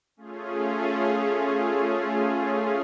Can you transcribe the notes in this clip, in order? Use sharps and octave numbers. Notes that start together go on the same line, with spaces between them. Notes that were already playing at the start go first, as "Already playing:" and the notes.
A3 C#4 F4 G#4